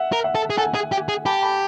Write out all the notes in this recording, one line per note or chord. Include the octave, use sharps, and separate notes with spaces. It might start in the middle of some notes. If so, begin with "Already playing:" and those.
Already playing: E5 F#5
A#4
E5 F#5
A4
G#4
A4 F#5 G#5
G#4
G4
G#4
G4 A5 B5
A5 B5